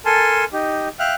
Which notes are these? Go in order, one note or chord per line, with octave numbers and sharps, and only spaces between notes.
A4 A#4 G#5 A5 C6
D#4 G4
E5 F5 G5 F6 F#6